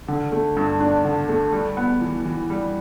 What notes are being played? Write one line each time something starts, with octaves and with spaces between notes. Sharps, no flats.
D3
A3
G2
D4
D3
A3
G3
B3
E3
E3
G3